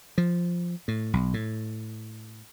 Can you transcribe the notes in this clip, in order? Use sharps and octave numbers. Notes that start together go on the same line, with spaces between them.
F3
A2
B1
A2